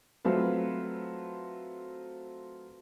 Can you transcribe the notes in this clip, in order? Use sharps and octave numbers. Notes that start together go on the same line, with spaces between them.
F#3 A3 C4 F4 B4